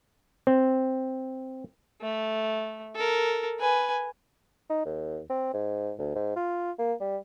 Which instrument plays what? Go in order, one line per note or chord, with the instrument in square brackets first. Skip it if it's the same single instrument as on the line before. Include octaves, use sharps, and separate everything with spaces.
[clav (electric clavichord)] C4
[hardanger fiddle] A3
A4 A#4
B4 G#5
[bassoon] D#4
D#2
C4
G#2
D2
G#2
F4
A#3
G3